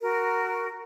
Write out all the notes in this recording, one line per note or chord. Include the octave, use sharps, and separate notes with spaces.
F#4 A#4